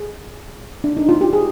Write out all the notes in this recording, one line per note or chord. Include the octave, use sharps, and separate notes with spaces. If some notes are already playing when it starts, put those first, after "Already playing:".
Already playing: G#4
D4
D#4
F4
G4
G#4